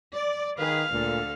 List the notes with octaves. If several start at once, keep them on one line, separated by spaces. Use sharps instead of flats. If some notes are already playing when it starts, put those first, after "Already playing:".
D5
D#3 G#4 B4 F5
D2 A#2 D3 A4